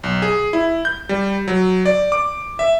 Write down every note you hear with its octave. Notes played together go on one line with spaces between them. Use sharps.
B1
G#4
E4
G6
G3
F#3
D5
D6
E5